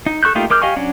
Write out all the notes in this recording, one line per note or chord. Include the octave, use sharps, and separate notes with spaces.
D#4
A4 C#6 F#6 G6
A3 A#3 D#4 F4 G4
G#3 A#4 D6 F6 G6
G4 D#5 F5 G#5 C#6
F#3 C#4 D4